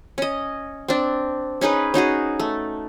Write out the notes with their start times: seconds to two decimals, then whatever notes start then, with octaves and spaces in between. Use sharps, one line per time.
0.18 C#4 D#5
0.88 C4 D4
1.61 C#4 D#4 G#4 B4
1.94 C#4 D#4 F#4 G#4
2.40 A3